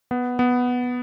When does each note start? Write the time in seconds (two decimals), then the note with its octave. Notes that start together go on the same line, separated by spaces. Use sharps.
0.11 B3
0.39 B3